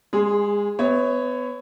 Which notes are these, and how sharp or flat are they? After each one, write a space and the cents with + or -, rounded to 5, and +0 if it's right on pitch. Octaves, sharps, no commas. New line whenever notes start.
G#3 -25 G#4 +0 C6 +0
B3 +25 C#5 -5 E5 -35